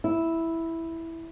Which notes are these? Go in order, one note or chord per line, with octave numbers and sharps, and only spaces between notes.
E4